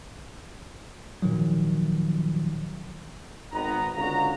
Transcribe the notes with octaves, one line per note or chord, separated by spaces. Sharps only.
A#2 D#3 F3 F#3
G#1 D#3 B3 A#5
C#2 D3 F#4 F5 A#5